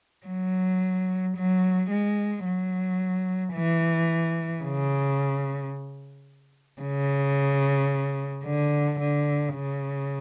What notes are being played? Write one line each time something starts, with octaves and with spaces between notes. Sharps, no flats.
F#3
F#3
G#3
F#3
E3
C#3
C#3
D3
D3
C#3